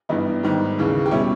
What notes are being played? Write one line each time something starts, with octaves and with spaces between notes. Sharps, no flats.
G2 E3 G3 B3 D#4
G#2 D#3 G3
D#2 C#3 E3
G4
B2 G3 C#4 E4